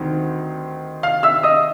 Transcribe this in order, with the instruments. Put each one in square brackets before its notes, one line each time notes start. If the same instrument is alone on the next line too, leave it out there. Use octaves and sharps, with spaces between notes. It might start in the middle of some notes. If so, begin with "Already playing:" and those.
Already playing: [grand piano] D2 C3 D#3
F5 F6
E5 E6
D#5 D#6